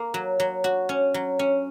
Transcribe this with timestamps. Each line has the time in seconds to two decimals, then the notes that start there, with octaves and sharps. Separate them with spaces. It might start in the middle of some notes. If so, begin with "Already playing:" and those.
Already playing: A#3
0.14 F#3
0.40 F#3
0.64 F#4
0.89 C#4
1.14 F#3
1.39 C#4